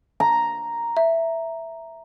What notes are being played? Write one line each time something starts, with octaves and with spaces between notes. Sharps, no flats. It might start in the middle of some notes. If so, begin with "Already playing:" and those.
A#5
E5